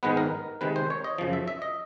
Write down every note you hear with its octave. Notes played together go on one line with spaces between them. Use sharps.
G#2 D#3 G#3 B3 B4
A#4
C3 D#3 G#3 B4
C5
C#5
D#5
F#2 C#3 F3
E5
E5
D#5